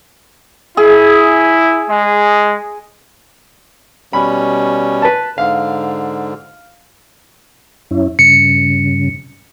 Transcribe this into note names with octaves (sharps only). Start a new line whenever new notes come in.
E4 G#4
G#3
B2 G3 C#4 B5
B4 A5
G#2 D3 F5
F#2 C#4 E4
G2 C#3 C#7